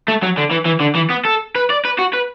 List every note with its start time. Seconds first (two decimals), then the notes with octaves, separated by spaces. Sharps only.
0.08 A3
0.23 F#3
0.38 D3
0.51 E3
0.66 E3
0.81 D3
0.95 E3
1.10 B3
1.25 A4
1.55 B4
1.70 D5
1.85 B4
1.98 F#4
2.13 B4